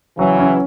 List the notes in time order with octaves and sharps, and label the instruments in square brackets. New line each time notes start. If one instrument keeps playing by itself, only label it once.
[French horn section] C#3 E3 [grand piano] F#3
[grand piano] C#4